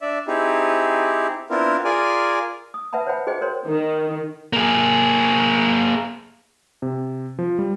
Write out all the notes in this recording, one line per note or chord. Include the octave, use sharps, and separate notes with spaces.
D4 D5 E5
C4 D#4 E4 G4 G#4
B3 C4 D4 E4 F4 A#4
F4 G#4 A#4 D5 G#5
D#6
B4 E5 F#5 A5 B5
C5 C#5 F#5 G5 B5
F#4 G#4 C5 D#5 G5
A#4 C5 C#5 C6
D#3
A#3 G#4
C3
F3
G3